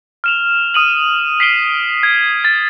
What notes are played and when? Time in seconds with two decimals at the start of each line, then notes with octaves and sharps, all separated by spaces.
0.24 F6 E7 F7
0.74 D#6 D#7 F#7
1.40 B6 C7 D7 G7
2.03 G#6
2.45 A6